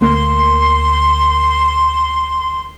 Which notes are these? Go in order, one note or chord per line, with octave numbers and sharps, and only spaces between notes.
D2 A#3 C6